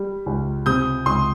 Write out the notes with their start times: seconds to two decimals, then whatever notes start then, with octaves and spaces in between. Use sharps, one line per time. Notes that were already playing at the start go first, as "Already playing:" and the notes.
Already playing: G3
0.26 C#2
0.66 C3 D#6 G6
1.06 C#2 C6 D#6